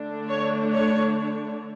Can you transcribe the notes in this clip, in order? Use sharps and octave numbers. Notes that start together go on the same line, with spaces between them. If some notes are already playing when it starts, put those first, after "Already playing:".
Already playing: D3 A3 D4
C#5
C#5